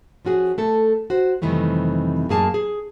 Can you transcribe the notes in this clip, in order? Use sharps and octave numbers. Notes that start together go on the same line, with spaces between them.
F3 C#4 F#4 G#4
A3 A4
F#4 C5
F2 C3 D#3 E3 G3 A3
F#2 A2 A#3 G#4 G#5 A5
G#4